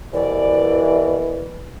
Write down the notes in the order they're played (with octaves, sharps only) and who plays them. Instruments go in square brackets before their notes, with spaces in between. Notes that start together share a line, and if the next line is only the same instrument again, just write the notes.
[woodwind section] C2 B2 E3 [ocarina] D5